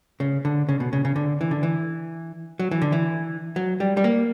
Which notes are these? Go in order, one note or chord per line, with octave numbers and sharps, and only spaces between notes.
C#3
D3
C#3
B2
C#3
C#3
D3
E3
D3
E3
F#3
E3
D3
E3
F#3
G3
G3
A#3